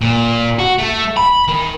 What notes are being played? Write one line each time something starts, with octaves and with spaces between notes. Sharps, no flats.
A#2
F#4
A3
B5
D#3